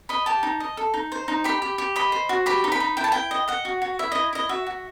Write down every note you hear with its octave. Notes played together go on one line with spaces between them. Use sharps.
D#5 B5
G4 A5
D#4
D#5
A4
D#4
C5
D#4
G4 B5
G4
G4
D#5 B5
C5
F#4
G4 B5
D#4
B5
D#4
E4 G5
A5
E4 G5
D#5
D#5 F#5
F#4
F#4
E4 E5
E4 D#5
E4 D#5
F#4 E5
F#4